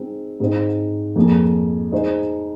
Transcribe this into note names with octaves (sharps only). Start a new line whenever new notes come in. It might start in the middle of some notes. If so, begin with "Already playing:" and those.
Already playing: G#3 C4 D#4
G#2 G#3 C4 D#4 C5
F2 F3 A#3 G#4
G#3 D#4 G#4 C5